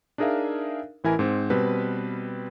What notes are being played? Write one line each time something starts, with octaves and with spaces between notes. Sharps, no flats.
D4 D#4 G#4 A#4 E5 F5
A1 E3 E4 A#4 G#5
G#2 C4
B2 G3 C4 B4